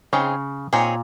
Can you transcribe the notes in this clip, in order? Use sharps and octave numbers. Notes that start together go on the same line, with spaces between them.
C#3 C4 D#4 G#4 C#5
A#2 C4 D#4 G#4 C#5